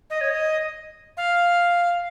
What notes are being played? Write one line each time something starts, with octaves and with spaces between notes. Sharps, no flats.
D#5
C#5
D#5
F5